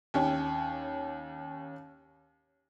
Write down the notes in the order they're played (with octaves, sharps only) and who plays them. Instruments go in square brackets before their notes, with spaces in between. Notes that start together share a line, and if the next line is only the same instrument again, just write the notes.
[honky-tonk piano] D#2 C#4 G4